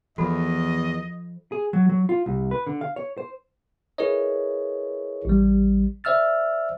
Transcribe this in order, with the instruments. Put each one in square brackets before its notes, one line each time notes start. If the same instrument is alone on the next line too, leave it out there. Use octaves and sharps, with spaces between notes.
[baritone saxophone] E2 [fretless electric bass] F3 [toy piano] F#4 A4 B5 [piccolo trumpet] D#5
[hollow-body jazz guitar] G#4
F#3
F#3
F4
C2
B4
D3
F5
C#5
C5
[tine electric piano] E4 G#4 A#4 B4 C#5 D#5
A1 G3
C5 D5 E5 E6 F6 A6